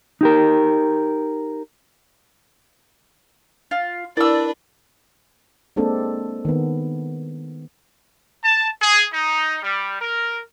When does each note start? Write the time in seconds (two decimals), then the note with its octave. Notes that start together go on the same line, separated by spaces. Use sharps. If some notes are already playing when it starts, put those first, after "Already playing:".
0.21 D#4 G4 A#4
3.71 F4
4.17 D4 E4 A#4 B4 D5 E6
5.76 G#3 A#3 C4 D4 A4
6.45 D#3 B3
8.44 A5
8.82 G#4
9.12 D#4
9.63 G3
10.01 A#4